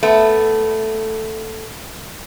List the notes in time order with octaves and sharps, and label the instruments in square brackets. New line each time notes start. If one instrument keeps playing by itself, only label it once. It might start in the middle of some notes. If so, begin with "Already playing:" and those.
[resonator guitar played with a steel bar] A3 B3